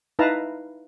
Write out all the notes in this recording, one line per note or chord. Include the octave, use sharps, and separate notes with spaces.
D#4 E4 B4 F5 A5 A#5